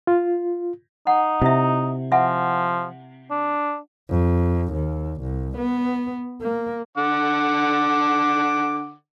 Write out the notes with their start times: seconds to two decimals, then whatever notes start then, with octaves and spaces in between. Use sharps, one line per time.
0.07 F4
1.07 D#4 F#5
1.42 C3 E4 E5
2.12 F3 E5 F#5 G#5
3.30 D4
4.10 F2
4.73 D#2
5.22 C2
5.58 B3
6.42 A#3
6.97 D3 F#5 D6